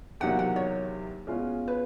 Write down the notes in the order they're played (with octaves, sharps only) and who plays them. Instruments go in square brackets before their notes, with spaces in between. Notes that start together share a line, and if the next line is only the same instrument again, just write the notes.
[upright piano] E2 C3 D#3 F#3 A#3 [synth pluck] F#5
[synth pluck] F#5
C#5
[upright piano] B2 G#3 C#4 F4
[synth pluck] B4